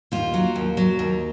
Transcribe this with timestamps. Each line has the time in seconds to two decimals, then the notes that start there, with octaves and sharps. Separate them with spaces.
0.12 D#2 F4
0.34 F#3
0.56 D#2
0.77 F#3
0.99 D#2